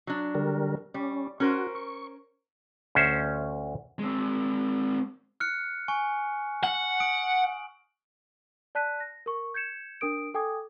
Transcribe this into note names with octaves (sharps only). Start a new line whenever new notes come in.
F#3 D4
D3 G3 A#4
G3 C#4
C#4 F#4 A#4 C5
C#6
D2 C#4 C5 E5
G#3 C4
F6 F#6 C#7
G#5 C#6
F#5 F#7
D#6 D7
D5 A5 F#6 B6 D#7
A#6
A#4 C#6
G6 G#6 C#7 E7
D4 A#4 D#6 D7
A4 G5 G#5 D6 D#6 G#6